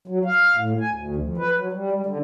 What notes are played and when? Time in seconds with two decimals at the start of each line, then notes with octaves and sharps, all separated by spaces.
0.08 F#3
0.25 F5
0.56 A2
0.81 G#5
0.93 D2
1.16 F2
1.38 B4
1.57 F#3
1.73 G3
1.92 G3
2.06 D3